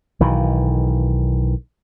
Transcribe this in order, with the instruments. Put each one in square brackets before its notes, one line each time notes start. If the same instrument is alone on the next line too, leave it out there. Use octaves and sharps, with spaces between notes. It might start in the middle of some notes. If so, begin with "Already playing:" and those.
[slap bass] B1 D#3 E3